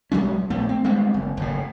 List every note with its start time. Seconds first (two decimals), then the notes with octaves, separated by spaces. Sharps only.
0.12 B1 F#3 G#3 C#4
0.50 A#1 A3 B3
0.69 C4
0.84 G3 G#3 B3 C4
1.14 F#1
1.37 F#1 A2